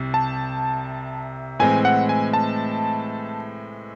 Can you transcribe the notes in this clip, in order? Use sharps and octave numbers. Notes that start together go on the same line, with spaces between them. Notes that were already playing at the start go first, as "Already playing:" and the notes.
Already playing: C2 C3
A5
A2 E3 G#3 C4 G#5
F#5
G#5
A5